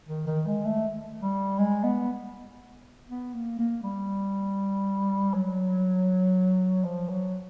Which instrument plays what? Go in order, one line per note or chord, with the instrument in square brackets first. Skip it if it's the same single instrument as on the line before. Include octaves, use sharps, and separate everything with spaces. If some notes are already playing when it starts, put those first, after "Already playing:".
[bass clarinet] D#3
D#3
G#3
A3
G3
G#3
B3
B3
A#3
A#3
G3
F#3
F3
F#3